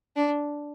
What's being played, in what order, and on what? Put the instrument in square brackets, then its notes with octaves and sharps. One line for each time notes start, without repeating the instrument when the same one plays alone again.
[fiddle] D4